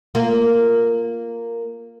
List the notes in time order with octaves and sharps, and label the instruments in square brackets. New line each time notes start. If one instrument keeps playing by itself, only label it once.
[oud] A#3 F4